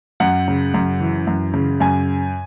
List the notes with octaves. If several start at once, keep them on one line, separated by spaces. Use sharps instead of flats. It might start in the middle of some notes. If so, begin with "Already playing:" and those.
F#2 F#5
C#3
F#2
E3
F#2
C#3
F#2 G#5